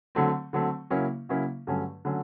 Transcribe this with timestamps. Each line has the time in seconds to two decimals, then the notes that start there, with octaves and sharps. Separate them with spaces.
0.15 D3 F#3 A3 C4
0.53 D3 F#3 A3 C4
0.90 C#3 F#3 A#3 C#4 E4
1.29 C#3 F#3 A#3 C#4 E4
1.67 G2 D3 F#3 A3 C#4
2.05 D3 F#3 A3 C#4